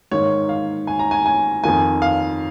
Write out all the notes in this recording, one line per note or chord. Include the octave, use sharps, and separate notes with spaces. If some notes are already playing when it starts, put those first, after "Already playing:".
G#2 D#3 A#3 C#5
F5
G#5
A#5
G#5
G#5
F2 D#3 A#3 G#5
F5